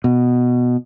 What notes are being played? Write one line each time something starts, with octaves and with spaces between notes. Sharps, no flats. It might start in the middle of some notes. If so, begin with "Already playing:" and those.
B2